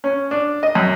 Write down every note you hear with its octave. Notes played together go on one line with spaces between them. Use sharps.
C#4
D4
D#5
F#2